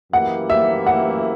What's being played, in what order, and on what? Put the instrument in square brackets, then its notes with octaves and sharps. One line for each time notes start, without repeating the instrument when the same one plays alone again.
[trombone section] F#2 E3 A#3 E4 G4 [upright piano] F#5
[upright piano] E5
F#5